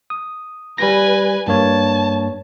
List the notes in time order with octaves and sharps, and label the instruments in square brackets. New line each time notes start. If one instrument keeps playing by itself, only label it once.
[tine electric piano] D#6
[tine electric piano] G3 A#6 [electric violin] B4 G#5
[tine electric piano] G2 A#3 C#5 [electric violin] A5